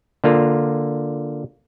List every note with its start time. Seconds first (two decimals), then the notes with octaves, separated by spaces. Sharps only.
0.24 D3 A#3 F4